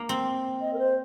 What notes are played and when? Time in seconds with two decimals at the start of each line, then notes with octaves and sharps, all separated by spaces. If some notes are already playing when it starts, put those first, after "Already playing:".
Already playing: A#3
0.09 C4
0.61 D#5
0.73 A#4
0.79 C5